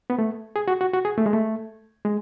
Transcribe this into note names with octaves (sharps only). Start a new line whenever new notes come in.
B3
A3
G#4
F#4
F#4
F#4
G#4
A3
G#3
A3
G#3